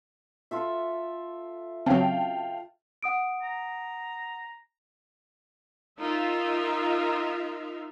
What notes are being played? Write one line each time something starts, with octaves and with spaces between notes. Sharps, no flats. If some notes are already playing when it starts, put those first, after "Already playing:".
F4 A4 E5
C#3 F#3 C4 F5 G5 A5
F#5 D#6 D7
A#5
D#4 F4 A#4 E5 F5